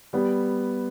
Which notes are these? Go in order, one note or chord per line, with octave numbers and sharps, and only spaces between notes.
G3 B3